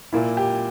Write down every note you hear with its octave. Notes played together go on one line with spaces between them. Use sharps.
A#2 A#3 E4
G4